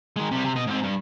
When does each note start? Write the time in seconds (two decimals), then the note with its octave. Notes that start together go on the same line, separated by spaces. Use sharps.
0.16 D#3 G#3
0.31 C3 G3
0.44 C3
0.56 B2 D#5
0.67 G#2 C4
0.83 G2